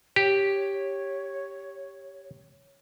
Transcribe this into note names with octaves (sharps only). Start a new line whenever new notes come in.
G4 C#5